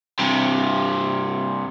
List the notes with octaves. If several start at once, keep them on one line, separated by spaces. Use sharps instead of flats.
G2 C3